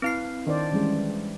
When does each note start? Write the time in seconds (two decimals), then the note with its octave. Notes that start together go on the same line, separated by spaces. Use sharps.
0.02 C4 E4 B4 F5 C7
0.47 D#3 D4 C5 D5
0.72 E3 G3 G#3 C#4